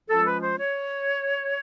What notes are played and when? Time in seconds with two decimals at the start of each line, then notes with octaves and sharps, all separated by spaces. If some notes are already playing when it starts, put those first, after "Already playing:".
0.10 F3 G#3 C#4 F4 A4
0.26 B4
0.42 C5
0.58 C#5